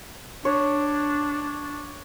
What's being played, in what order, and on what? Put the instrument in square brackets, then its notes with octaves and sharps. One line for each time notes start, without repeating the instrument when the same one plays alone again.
[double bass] D4 [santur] C#5